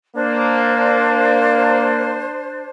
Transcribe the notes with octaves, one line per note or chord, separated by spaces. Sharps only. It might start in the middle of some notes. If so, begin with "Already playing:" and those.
A#3 D4 C5